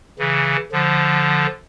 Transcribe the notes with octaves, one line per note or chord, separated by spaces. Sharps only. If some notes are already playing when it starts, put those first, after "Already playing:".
C#3 E3
D3 F3